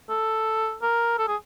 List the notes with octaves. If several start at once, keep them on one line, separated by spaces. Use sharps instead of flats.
A4
A#4
A4
G#4